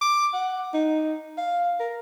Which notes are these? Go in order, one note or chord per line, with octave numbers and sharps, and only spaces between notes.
D6
F#5
D#4
F5
A#4